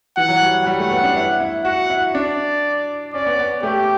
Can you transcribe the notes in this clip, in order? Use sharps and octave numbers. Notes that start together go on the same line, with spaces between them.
E3 F#5
F#3
G3
G3 F#5
A3
B3
D4
E4
E4
F#4 F#5
E4
D4 D5
C#4 D5
B3
B3
A3 G4